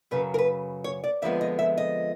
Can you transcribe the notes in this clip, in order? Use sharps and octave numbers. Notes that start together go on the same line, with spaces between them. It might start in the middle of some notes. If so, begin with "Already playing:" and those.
F#2 C#3 F#3 B4
A#4
B4
C#5
D5
F2 D3 F3 G#3 B3 E5
D#5
E5
D#5